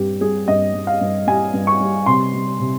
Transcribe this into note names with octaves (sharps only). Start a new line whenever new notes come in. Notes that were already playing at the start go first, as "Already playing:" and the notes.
Already playing: G2 G3 G4
G3 G#4
G2 D#5
G3
F5
G2
G3 G#5
G2
C#6
G3
C3 C6
G3
C3